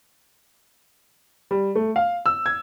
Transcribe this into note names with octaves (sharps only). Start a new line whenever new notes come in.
G3
A3
F5
E6
G#6